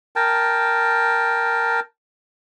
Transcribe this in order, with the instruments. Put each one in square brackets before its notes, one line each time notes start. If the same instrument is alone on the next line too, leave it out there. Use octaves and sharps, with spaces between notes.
[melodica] A#4 G5 A5